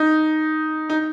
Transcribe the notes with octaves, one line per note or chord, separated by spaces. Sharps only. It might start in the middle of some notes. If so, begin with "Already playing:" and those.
Already playing: D#4
D#4